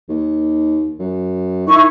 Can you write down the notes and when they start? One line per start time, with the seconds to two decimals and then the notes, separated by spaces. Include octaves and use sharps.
0.09 D#2
0.99 F#2
1.67 D#3 E4 C#6